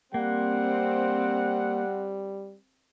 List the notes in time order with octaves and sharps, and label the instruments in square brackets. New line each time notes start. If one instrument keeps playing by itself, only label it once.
[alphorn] G3 [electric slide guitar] A#3 [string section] C4 [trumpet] F#5